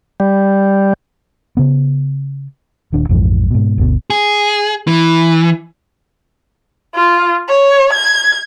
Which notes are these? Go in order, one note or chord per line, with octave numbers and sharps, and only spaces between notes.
G3
C#3 B3
D#1 D#2 D4
A#1 F2 G#2 E3
G#2 B2
G1 D2 B2
G#4
E3
F4
C#5
G#6